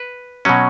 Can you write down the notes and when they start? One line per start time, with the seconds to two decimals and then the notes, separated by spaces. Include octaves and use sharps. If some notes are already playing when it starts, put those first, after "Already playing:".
Already playing: B4
0.45 B2 F#3 C#4